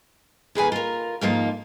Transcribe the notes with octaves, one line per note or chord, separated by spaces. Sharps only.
D#2 G#4 B4 G#5
F4 A#4
F2 G#2 F3 A#3 D#4 F4